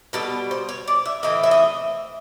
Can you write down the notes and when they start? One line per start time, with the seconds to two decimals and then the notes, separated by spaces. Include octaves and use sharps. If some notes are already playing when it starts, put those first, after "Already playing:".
0.13 B2 G3 B3 A4
0.51 C5
0.69 C#5
0.88 D5
1.06 E5
1.23 A2 E3 A3 C4 D#5
1.43 E5
1.51 D#5